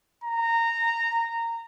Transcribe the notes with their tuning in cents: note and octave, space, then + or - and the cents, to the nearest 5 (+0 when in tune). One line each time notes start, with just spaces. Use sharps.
A#5 -15